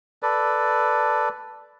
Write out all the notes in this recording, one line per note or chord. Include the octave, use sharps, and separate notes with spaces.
A4 B4 D5